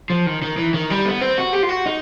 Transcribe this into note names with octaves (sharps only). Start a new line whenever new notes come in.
F3
D#3
D#3
E3
D#3
G3
B3
C4
F#4
G4
F4
F#4
D#4